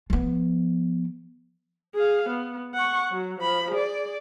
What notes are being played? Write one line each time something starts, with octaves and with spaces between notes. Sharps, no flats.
F3 B3
G#4 F5
B3
F#5 C#6
F#3
F3 B5
G#4 D5